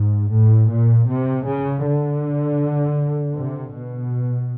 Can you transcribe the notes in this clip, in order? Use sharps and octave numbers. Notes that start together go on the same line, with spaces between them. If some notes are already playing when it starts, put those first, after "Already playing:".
Already playing: G#2
A2
A#2
C3
C#3
D3
C3
B2